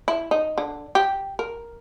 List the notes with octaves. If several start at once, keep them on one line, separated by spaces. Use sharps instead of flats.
E4
D#4
D3
G4
A#4